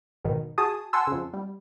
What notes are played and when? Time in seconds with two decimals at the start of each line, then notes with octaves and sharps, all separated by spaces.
0.25 G#1 G#2 B2 D#3
0.58 F#4 G#4 G#5 A5 D#6
0.93 F#5 G#5 A5 C6 E6
1.07 F2 C#3
1.33 G3